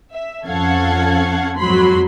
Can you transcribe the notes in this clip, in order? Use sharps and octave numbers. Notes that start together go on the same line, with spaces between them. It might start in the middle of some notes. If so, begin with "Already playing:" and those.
E5
F2 C#4 A4 F5 F#5 G#6
F2 G#2 F#3 B5 C6